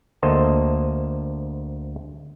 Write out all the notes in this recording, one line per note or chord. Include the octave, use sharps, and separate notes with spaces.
D2 A#3 A4 C5 D#5 A5